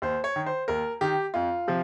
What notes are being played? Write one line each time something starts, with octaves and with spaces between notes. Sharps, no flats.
D#2 C5
C#5
D#3
C5
D#2 A#4
D#3 G4
F2 F4
C3 F3